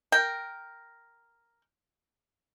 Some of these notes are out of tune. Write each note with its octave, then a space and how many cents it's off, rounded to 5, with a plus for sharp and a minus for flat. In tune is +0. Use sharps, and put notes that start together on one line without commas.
A#4 +0 G5 +0